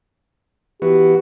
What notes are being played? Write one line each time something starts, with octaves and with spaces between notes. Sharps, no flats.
E3 B3 F#4 G4